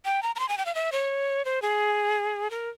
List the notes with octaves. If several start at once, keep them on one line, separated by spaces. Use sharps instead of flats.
G5
A#5
A#5
C6
G#5
G5
F5
E5
C#5
C5
G#4
A#4